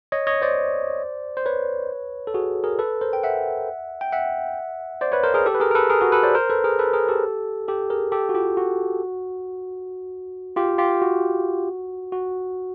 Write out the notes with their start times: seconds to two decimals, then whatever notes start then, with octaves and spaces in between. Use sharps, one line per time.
0.12 C#5 D#5
0.27 C#5 D#5
0.42 C5 D5
1.37 C5
1.46 B4 C#5
2.27 A4
2.34 F#4 G#4
2.64 G#4 A#4
2.79 A4 B4
3.01 A#4 C5
3.13 G5
3.23 E5 F#5
4.01 G5
4.12 E5 F#5
5.01 C5 D5
5.12 B4 C#5
5.23 A#4 C5
5.34 G#4 A#4
5.46 G4 A4
5.55 B4
5.60 G#4 A#4
5.71 A#4
5.75 A4 B4
5.90 G#4 A#4
6.01 F#4 G#4
6.12 A4 B4
6.23 C5 D5
6.35 A#4 C5
6.50 A4 B4
6.64 G#4 A#4
6.79 A4 B4
6.93 G#4 A#4
7.08 G4 A4
7.68 G4 A4
7.90 G#4 A#4
8.12 G4 A4
8.29 F#4
8.34 F4 G4
8.57 F#4
10.56 F4 G4
10.78 F4 G4
11.02 F#4
12.12 F#4